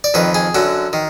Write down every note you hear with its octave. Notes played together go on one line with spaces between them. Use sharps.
D5
F2 D#3 B4
G#4
F#2 D3 F#4
D#3